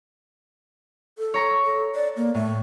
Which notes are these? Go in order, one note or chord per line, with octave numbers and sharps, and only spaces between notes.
A4
C#5 A#5 C#6
A4
D5
A#3
A2 A3